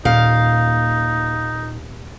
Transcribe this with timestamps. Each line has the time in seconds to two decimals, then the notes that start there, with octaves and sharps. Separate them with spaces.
0.05 D#1 A#2 D#4 F5